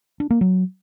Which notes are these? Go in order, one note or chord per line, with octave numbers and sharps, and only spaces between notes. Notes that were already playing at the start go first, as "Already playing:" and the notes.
D4
A#3
F#3